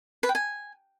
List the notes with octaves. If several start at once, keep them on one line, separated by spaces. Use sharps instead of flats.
B4
G5
G#5